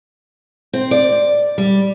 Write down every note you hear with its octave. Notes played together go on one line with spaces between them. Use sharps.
C4
D5
G3